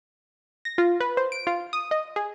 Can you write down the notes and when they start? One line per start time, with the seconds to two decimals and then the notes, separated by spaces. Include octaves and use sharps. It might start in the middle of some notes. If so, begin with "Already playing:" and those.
0.65 A#6
0.78 F4
1.00 B4
1.17 C5
1.32 D7
1.47 F4
1.73 D#6
1.91 D#5
2.16 G#4